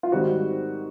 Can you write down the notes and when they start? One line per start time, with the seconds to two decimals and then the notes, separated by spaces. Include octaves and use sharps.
0.03 F4
0.12 G#2 D#3 G3 C4 F#4